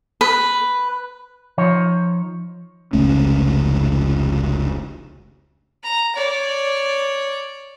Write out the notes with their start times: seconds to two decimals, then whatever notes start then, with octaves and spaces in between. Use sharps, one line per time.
0.21 B4
1.58 F3 D#4 C#5
2.93 F1 C#2 A3 C#4
5.83 A#5
6.15 C#5 D5